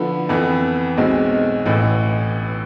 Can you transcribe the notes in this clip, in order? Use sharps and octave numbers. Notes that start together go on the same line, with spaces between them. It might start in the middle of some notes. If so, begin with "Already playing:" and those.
Already playing: D3 F3 B3 E4 B4
F2 E3 B3
B1 B2 G#3 C4
A1 A2 E3